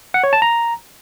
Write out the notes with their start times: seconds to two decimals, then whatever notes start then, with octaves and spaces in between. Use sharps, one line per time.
0.14 F#5
0.24 C#5
0.33 A5
0.42 A#5